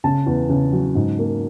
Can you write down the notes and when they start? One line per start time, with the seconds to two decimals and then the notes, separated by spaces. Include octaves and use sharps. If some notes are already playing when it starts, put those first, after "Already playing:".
0.04 C#3 A5
0.26 E2
0.49 C#3
0.73 F#3
0.95 G#2
1.19 A#3